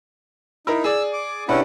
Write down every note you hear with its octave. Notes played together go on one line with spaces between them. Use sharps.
D#4 E4 A#4
G#4 D5 E6
D6
C3 C#4 D4 E4 B4 F#5